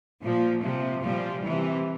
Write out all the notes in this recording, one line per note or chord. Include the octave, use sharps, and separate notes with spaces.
A#2 F3
C3 F3
A#2 F3 G3
C3 E3